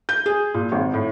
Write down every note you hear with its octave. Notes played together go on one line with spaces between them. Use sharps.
G6
G#4
A#2
G#1
A2